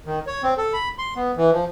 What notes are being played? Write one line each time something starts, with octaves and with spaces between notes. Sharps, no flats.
D#3
C#5
C4
A4
B5
C6
B3
E3
F3